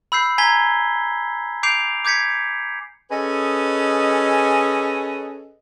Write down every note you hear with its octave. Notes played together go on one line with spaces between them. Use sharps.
B5 E6 G6 C7
G#5 A#5 G#6 B6 G7
D6 G6 C7 D7 F7
D6 G6 G#6 B6 C#7
C#4 G#4 A4 B4 D#5